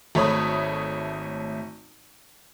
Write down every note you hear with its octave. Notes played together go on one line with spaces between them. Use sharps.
G#1 A3 C#5 B5 D#6